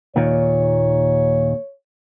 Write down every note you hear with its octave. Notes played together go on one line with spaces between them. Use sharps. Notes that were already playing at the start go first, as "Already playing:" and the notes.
D#2 A#2 D#3 C#5